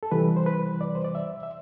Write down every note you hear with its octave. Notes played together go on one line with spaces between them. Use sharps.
A4
C3 E3 G3 B4
C5
B4
D5
C5
D5
E5
E5